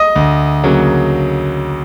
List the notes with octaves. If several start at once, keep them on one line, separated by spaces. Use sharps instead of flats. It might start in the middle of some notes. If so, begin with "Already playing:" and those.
Already playing: D#5 D#6
D2
C#3 F#3 A#3